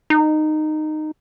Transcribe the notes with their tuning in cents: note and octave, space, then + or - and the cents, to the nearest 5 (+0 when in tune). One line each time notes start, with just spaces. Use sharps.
D#4 -15